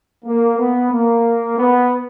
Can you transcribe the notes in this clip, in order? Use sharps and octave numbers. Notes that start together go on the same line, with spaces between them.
A#3
B3
A#3
B3